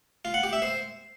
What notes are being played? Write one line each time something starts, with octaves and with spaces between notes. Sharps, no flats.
F4
F#5
G4
E5
C5